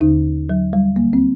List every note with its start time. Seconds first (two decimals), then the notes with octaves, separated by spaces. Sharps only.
0.01 D#2 D3 D#4
0.49 F#3
0.73 G3
0.96 D2 D3 A#3
1.13 C4